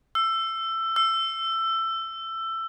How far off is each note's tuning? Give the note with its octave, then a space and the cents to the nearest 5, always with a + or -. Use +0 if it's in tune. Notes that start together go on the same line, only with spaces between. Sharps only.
E6 +20
E6 +20